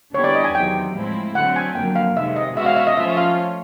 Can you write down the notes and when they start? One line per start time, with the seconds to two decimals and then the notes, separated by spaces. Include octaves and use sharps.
0.14 D3 G3 B3 E4 G4 C#5
0.24 D5
0.35 D#5
0.44 G#5
0.54 E2 C3 D#3 F#3 G5
0.95 A2 F3 G#3 C4 E4
1.35 D3 F#3 A3 C4 F#5
1.56 G#5
1.75 F2 D3 F#3 A#3 G5
1.96 F5
2.16 C3 D#3 G#3 E5
2.36 D#5
2.56 B2 G#3 C#4 F#4 E5
2.66 F5
2.77 E5
2.87 D#5
2.97 F3 A3 C#4 F4 E5
3.17 F5